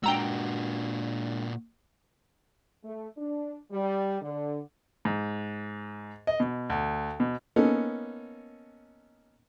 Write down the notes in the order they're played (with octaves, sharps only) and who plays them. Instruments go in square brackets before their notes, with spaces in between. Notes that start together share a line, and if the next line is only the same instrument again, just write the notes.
[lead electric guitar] A#2 F#4 [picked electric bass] G#3 D4 [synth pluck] G5 A#5 E6
[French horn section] A3
D4
G3
D3
[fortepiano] G#2
D#5
B2
D2
B2
A#3 B3 C#4 D#4 A4